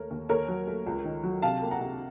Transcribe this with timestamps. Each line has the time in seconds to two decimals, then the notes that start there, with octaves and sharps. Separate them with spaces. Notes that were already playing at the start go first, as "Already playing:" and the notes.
Already playing: D#2 A3 A#4 C#5
0.11 D#2
0.29 D#2 A#4 C#5
0.48 F#3
0.67 A3
0.86 C#2
1.05 D#3
1.24 F#3
1.42 C3 F5 A5
1.62 A#3
1.71 F#5 A#5
1.80 C3